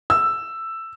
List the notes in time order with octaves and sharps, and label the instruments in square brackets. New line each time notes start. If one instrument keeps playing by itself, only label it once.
[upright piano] E6